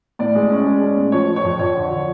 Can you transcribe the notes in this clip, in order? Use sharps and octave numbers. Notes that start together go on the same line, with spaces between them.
A2 D5
G#3
C#4
G#3
C#4
A2
F3 C#5
F3
C#5
F2
F2 C#5
D3
F3